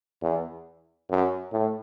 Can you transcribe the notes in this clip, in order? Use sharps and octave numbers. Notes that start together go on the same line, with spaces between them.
E2
F#2
A2